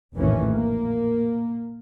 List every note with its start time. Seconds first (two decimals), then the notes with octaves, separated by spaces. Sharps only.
0.16 F1 A#1 A2 D#3 E3 C#4
0.52 A#3